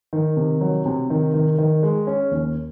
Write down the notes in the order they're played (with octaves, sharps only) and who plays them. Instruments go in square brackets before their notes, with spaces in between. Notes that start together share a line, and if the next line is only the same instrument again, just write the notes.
[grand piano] D#3
C3
F#3
C3
D#3
D#3
D#3
G#3
C#4
D#2